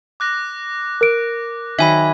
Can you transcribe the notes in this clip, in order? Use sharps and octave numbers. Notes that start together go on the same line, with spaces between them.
D6 F#6 A#6
A#4 D7
D#3 F#3 E5 G#5 B5 G#6